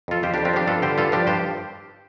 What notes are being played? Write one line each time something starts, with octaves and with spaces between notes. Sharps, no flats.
F2 F4 A4
F2 G4 C5
F2 D4 G4
C4 F4
F3 D4 G4
G2 F4 A4
D3 G4 C5
G2 F4 A4
F3 D4 G4
G2 G4 C5